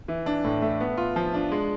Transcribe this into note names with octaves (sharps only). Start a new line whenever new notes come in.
E3
D4
A2
A3
B3
F4
F3
D4
G#3